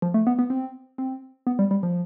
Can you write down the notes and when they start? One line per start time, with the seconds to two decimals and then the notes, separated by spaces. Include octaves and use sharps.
0.02 F3
0.14 A3
0.27 B3
0.39 B3
0.50 C4
0.98 C4
1.47 B3
1.59 G3
1.71 G3
1.83 F3